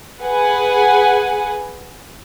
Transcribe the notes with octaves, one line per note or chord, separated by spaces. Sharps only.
G#4 B4 F#5 G#5